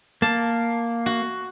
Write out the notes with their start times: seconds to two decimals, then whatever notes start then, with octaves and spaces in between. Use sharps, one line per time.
0.22 A#3 A5
1.06 F#4